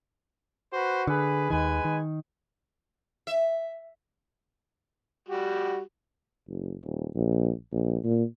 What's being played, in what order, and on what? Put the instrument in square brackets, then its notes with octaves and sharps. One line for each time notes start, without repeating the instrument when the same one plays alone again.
[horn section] F#4 B4 C5
[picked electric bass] D3 [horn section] G#4 B4
[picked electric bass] D#2 D#3 [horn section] G#3 B4 G#5
[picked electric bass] D#3
[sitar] E5
[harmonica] G3 F#4 G4
[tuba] F#1
D#1
A#1
A#1
A#2